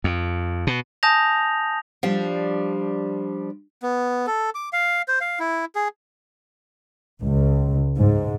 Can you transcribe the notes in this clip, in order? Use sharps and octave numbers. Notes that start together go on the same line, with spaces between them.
F2
B2
G#5 A5 D#6 G6 A#6 F7
F3 G3 D4
B3
A4
D6
F5
C5
F5
E4
G#4
C#2
G#2